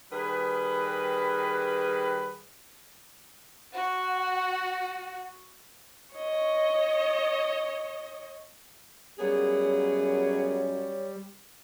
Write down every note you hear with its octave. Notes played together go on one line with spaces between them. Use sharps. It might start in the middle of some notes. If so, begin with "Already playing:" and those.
D#3 G3 G#4 B4
F#4 F#5
C#5 D#5
F#2 G3 A#3 B3 G#4 C#5